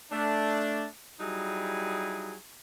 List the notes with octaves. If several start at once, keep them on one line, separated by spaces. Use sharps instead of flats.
A3 D4
F#3 G3 D#4 E4 G#4